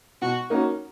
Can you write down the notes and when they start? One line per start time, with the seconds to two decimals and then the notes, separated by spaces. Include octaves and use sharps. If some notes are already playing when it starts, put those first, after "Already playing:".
0.22 B2 F#4
0.50 A#3 C#4 D#4 F#4